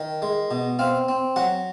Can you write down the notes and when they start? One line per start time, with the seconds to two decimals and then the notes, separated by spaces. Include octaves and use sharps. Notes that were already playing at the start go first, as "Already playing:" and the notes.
Already playing: D#3
0.22 G#3
0.51 B2
0.79 C4 F5
1.08 C4
1.36 F#3 F#5